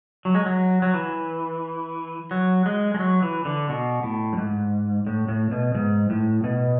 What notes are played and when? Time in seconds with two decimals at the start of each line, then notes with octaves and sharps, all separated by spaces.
0.25 F#3
0.35 G#3
0.46 F#3
0.82 F#3
0.94 E3
2.31 F#3
2.66 G#3
2.94 G#3
2.99 F#3
3.22 E3
3.45 D3
3.69 B2
4.03 A2
4.33 F#2
4.37 G#2
5.06 A2
5.28 A2
5.51 B2
5.75 G#2
6.10 A2
6.44 B2